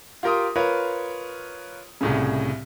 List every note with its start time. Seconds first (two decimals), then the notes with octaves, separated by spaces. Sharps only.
0.23 F4 G4 A#4 C6 D#6
0.56 F4 A#4 B4 C#5
2.01 C2 A2 C#3